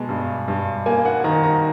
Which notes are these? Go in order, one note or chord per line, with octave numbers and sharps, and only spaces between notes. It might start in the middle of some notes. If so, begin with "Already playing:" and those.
Already playing: B2 G#3 A5
G2
G2
A#3 G#5
F#5
D#3 A#5
A#5